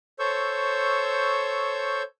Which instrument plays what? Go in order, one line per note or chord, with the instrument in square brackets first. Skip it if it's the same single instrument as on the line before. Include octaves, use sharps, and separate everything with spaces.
[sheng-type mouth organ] A4 C5 C#5 C#6 E6 G6